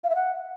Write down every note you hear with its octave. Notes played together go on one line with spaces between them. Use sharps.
F5
E5
F#5